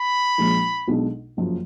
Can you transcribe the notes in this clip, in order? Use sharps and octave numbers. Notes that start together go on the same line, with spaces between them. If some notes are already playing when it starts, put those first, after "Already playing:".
Already playing: B5
A#1 A#2 F3 G#3
B1 B2 G#3 D4
F#1 F#2 F3